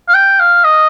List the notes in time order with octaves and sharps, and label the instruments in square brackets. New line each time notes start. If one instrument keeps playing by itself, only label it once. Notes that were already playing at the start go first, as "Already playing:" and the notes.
[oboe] F5
G5
F5
D#5